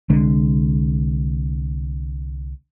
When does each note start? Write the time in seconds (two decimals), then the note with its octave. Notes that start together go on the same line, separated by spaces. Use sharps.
0.10 C2 D3 G#3 D4